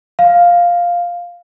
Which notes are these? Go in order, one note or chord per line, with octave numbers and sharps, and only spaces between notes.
F5